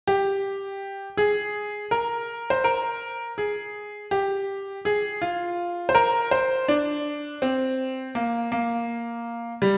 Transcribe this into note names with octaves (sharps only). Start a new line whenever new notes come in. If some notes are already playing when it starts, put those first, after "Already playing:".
G4
G#4
A#4
C5
A#4
G#4
G4
G#4
F4
C5
A#4
C5
D4
C4
A#3
A#3
G3